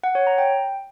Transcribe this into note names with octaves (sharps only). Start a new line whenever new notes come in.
F#5
C#5
A#5
G5